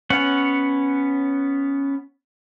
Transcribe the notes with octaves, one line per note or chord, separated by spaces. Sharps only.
B3 C#4 C#5 F#5